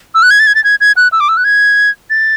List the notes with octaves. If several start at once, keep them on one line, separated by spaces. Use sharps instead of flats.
E6
F#6
G#6
A6
G#6
A6
G#6
G#6
F#6
E6
D6
E6
F#6
G#6
A6